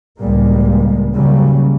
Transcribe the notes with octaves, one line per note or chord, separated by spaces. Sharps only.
C#2 A2 G3 G#3 A#3
D#2 C#3 F#3 G3